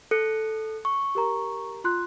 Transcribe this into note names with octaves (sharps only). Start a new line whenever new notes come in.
A4 F#6 C#7
C#6
G4 A#4 A#5
F4 C6 F#6